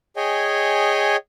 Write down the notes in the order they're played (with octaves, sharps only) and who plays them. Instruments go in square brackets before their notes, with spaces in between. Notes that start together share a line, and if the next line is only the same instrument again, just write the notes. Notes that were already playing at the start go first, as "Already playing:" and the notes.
[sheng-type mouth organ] G#4 C#5 D#5 G5 G#5